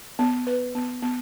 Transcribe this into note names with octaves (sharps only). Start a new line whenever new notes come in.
B3
B4
B3
B3